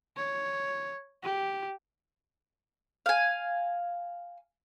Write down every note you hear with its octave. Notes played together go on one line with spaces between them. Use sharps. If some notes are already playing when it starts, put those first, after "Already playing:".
C#5
G4
F5 G#5